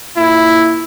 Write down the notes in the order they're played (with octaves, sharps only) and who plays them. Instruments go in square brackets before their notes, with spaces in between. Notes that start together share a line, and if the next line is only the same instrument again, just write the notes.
[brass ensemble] A#2 E4